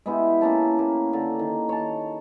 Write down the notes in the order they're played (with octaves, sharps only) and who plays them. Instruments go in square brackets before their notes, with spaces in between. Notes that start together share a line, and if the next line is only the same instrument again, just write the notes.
[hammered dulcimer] G#3 B3 E4 G4
A#3 C#4 A5
A#3
D3
D#3
C#5 A5